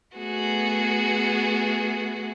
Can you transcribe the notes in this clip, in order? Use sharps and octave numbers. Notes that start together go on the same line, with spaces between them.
A3 B3 F#4 G#4